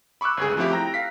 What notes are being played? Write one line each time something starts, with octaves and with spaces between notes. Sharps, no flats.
B5 C#6 D6 E6 F#6
G1 C#2 G#4
F3 A3 C4 E4 G4
G5 A#5 A#6
F5 B6